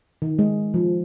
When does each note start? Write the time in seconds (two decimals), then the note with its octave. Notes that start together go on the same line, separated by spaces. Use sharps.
0.22 D#3
0.39 G#3
0.74 F3